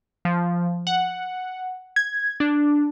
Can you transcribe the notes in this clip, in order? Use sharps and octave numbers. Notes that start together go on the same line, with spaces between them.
F3
F#5
G#6
D4